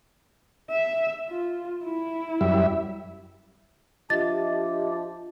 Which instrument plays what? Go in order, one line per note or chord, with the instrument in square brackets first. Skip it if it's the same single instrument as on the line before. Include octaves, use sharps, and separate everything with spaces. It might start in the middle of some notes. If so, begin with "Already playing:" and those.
[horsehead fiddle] E5
F4
E4
[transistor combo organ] F#2 G3 E5
[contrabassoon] F3 [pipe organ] D4 G4 [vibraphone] D#5 E5 [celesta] A6